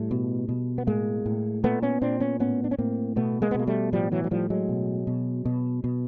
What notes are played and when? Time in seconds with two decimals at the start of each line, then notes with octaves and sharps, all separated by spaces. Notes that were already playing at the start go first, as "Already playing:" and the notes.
Already playing: A2 G3 A3
0.11 B2
0.49 B2
0.78 B3
0.87 A2 G#3 A#3
1.26 A2
1.64 A#2 A3 B3
1.82 B3 C#4
2.02 A#2 C4 D4
2.20 B3 C#4
2.40 A2 B3 C#4
2.64 D4
2.71 C#4
2.78 A2 A#3 C4
3.16 B2 A3 B3
3.42 G#3 A#3
3.51 B3
3.55 B2 A#3
3.67 G3 A3
3.93 A2 F3 G3
4.12 E3 F#3
4.24 F#3
4.31 A2 F3 G3
4.50 F#3 G#3
4.69 B2
5.07 B2
5.46 B2
5.84 B2